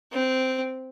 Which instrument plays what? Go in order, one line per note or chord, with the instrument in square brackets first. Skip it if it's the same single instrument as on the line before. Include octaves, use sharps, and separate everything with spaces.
[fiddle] C4